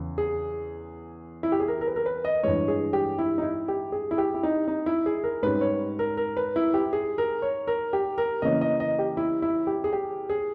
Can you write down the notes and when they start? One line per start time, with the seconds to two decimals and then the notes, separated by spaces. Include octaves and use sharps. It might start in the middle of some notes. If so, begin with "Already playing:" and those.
Already playing: E2 C#3
0.18 G#4
1.43 E4
1.52 G4
1.60 G#4
1.68 A#4
1.81 A#4
1.87 B4
1.96 A#4
2.06 B4
2.25 D#5
2.43 G2 E3 G#3 C#5
2.68 G#4
2.93 G4
3.19 E4
3.38 D#4
3.42 E4
3.68 G4
3.92 G#4
4.11 E4
4.18 G4
4.34 E4
4.43 D#4
4.68 D#4
4.86 E4
5.06 G#4
5.24 A#4
5.42 G#2 G3 C#4 B4
5.61 C#5
5.99 A#4
6.17 A#4
6.37 B4
6.56 E4
6.74 G4
6.93 G#4
7.18 A#4
7.42 C#5
7.67 A#4
7.93 G4
8.18 A#4
8.42 C#3 E3 A#3 C#4 D#5
8.61 D#5
8.80 D#5
8.99 G4
9.17 E4
9.42 E4
9.67 G4
9.84 G#4
9.93 G4
10.30 G#4